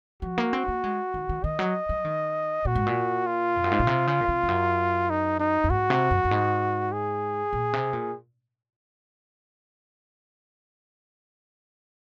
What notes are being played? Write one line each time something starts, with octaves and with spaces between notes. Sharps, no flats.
F3 F#4
A#3
C4
A#3
G#3
D#3
D#3
D#3 D#5
F#3
F#3
D#3
A#2 F#4
G#2
A#2
F4
F2
F#2
G#2
A#2
C3
C#3
A#2
C3
F2
F#2
D#4
D#4
F#2
G#2 F#4
C3
F#2
F#2
G#2
G#4
A#2
C3
A#2